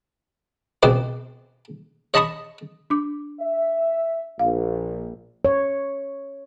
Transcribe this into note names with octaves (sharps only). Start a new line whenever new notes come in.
C#2 B2 C4 D6
C#5 D#5 A5 B5 C#6 D#6
D4 D6
E5
A#1 F5
C#5